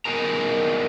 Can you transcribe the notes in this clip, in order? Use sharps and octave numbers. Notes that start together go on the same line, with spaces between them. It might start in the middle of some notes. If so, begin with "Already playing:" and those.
B3 D#4 F#4 G#4 A#4 A#5